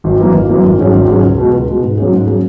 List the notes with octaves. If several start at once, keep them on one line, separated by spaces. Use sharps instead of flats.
G#1
F#2 E3 A#3
G#1
F#2 E3 A#3
G#1
G#2 F#3 C#4 G#4
G#1
G#2 F#3 C#4 G#4
C#2
B2 G#3
C#2
B2 G#3
G#2
F#3 A#3 C#4 G#4
G#2
F#3 A#3 C#4 G#4